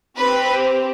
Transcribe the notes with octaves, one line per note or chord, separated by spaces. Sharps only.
C4 G4 B4